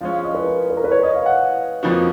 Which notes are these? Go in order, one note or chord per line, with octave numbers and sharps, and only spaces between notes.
F3 G#3 C#4 F5
F5
D#5
B4
A#4
B4
A#4
B4
C#5
D#5
F5
F#5
F2 F3 A#3 D#4 F#4